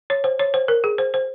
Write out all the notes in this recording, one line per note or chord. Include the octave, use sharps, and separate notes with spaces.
C#5
C5
C#5
C5
A#4
G#4
C5
C5